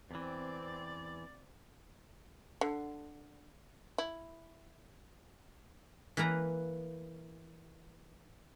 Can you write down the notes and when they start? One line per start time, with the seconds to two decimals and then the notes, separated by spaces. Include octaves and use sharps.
0.11 E2 E3 C4 D5
2.61 D3
3.98 E4
6.17 E3 A#3 B4 A#5